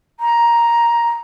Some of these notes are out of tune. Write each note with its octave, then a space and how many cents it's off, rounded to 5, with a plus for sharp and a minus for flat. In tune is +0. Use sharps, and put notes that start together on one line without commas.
A#5 +10